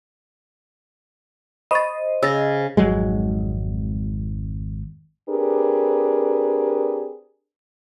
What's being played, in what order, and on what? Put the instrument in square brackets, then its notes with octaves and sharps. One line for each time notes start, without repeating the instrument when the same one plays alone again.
[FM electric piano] C5 D#5 [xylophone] B5 C#6 A6
[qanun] C#3 [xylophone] E6 A6 A#6
[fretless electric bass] G#1 F2 F#3 G#3
[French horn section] C4 D4 G4 G#4 A#4 B4